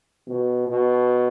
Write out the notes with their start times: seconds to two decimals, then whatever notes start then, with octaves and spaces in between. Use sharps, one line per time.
0.27 B2
0.68 B2